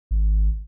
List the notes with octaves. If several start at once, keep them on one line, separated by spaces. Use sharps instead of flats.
G#1